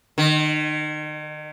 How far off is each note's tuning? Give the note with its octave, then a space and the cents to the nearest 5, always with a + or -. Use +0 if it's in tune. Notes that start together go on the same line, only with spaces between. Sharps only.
D#3 -35